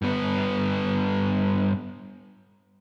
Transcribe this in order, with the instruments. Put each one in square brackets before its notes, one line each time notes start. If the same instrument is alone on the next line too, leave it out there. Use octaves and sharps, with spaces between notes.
[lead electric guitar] G2 B3